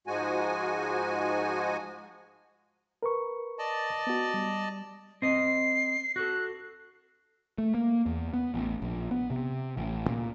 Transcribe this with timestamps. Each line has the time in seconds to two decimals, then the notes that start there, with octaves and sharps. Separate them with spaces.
0.07 G#2 F3 G#3 F#4 G#5
3.03 A#4 B4 C#6
3.59 D5 D#5 A5
4.07 B3 F#4
4.34 G3
5.22 C4 D#5 C7
6.16 F#4 A4 F#6
7.58 A3
7.74 A#3
8.06 E2
8.34 B3
8.54 A1
8.82 A#1
9.11 B3
9.30 C3
9.77 A1
10.08 A#2